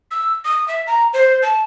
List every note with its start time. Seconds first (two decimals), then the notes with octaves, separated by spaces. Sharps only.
0.11 E6
0.44 D#6
0.68 E5
0.87 A#5
1.13 C5
1.42 A5